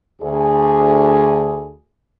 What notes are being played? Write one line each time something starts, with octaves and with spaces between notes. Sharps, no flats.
D2 G#4